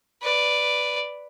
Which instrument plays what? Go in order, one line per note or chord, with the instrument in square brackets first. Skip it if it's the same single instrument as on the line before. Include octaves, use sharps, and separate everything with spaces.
[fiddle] B4 D5